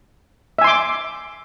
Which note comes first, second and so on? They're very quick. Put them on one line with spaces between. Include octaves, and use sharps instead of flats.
E5 G#5 C6 D6